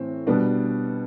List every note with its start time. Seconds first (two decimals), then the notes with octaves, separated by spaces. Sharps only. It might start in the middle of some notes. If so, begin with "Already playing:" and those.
Already playing: A2 E3 A3 C4
0.27 B2 G3 B3 D4